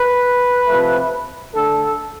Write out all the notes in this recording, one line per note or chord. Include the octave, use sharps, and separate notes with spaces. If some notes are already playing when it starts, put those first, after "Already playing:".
Already playing: B4
C3 F3 A3
D3 A3 A4